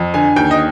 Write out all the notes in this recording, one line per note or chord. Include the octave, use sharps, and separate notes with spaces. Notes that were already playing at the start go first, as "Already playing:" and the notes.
Already playing: F2
D3 G#5
D#2 G5
D#5